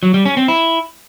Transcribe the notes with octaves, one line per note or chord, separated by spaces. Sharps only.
F#3
G3
C#4
C4
E4